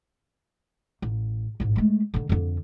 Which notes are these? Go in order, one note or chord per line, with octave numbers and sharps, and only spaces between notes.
A1
A1 G#2
G#3 A3
D3 D#3
F2 D3